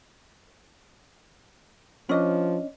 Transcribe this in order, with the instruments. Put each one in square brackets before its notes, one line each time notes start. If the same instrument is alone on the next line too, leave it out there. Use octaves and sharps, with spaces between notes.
[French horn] F3 [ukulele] C#4 D4 D#5